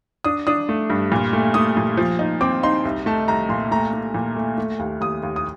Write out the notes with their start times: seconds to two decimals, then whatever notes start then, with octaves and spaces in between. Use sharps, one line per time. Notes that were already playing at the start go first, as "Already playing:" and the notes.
0.24 D4 D#6
0.47 D4 D#6
0.69 A3
0.90 G2
1.12 A#2
1.33 A3
1.54 A3 D#6
1.77 A#2
1.97 F3
2.19 D#4
2.41 C4 D6
2.63 D#4 C6
2.85 C2
3.06 A3 A5
3.28 C2 A#5
3.49 A#2 C6
3.71 A3 A#5
3.93 A3
4.14 A#2
4.36 A3
4.58 A3
4.79 D#2
5.01 D#2 D#6
5.23 D#2
5.36 D#6